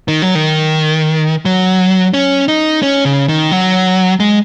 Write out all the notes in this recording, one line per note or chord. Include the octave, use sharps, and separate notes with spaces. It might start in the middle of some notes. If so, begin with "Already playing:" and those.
D#3
F#3
D#3
F#3
C#4
D#4
C#4
C#3
D#3
F#3
G#3